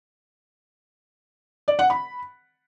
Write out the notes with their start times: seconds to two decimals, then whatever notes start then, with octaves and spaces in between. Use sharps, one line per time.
1.68 D5
1.79 F#5
1.90 B5